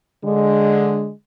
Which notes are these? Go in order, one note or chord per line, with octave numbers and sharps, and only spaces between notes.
D3 G#3